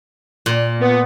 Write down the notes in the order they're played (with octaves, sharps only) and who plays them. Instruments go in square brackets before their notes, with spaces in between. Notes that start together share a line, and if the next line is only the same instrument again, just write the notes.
[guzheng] A#2
[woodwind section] B3